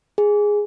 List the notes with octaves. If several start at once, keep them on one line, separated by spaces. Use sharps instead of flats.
G#4